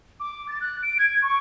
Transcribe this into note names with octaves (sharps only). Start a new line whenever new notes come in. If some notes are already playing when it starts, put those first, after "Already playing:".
D6
A6
F#6
D7
G#6
C#6